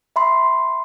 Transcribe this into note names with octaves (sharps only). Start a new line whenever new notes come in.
E5 B5 C6